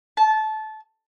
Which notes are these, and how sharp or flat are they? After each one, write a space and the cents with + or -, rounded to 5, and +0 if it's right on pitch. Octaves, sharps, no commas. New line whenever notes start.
A5 -20